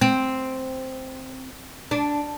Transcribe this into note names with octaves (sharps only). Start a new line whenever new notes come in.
C4
D4